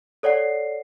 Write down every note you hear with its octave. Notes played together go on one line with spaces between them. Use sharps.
A4 C#5 D5 F#5 C7